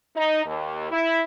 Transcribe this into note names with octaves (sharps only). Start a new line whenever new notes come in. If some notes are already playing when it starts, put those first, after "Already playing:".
D#4
D#2
E4